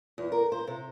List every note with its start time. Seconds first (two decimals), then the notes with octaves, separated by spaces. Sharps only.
0.18 E2
0.32 A#4
0.52 C5
0.67 C3